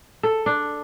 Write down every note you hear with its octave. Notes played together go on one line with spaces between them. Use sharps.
A4
D4